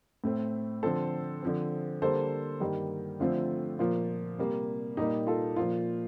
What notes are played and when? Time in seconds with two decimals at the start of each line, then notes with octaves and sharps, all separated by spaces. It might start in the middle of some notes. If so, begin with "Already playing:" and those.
0.24 A2 A3 C4
0.83 D3 F3 C4 A4 C5
1.42 D3 F3 C4
2.02 D3 G3 A#3 A4 C5
2.60 G2 D#3 G3 A#3
3.20 D3 F3 A3 C4 F4
3.79 A#2 F3 A#3 F4
4.38 C3 G3 A#3
4.97 A#2 G3 A#3 D#4 G4
5.27 F4 A4
5.56 A#2 F3 A#3 F4